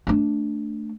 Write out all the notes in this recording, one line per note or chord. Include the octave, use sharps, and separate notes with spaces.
A3 D4